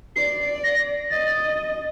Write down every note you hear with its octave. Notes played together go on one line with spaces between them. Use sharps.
D5 C7
A#6
D#5 A6